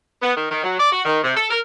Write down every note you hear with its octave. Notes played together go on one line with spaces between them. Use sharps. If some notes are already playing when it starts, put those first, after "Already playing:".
B3
D#3
D#3
F#3
D5
F#4
D#3
C3
A4
A#4